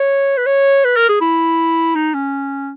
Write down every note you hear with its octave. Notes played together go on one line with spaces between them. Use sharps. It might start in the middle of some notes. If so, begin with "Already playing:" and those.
Already playing: C#5
B4
C#5
B4
A#4
G#4
E4
D#4
C#4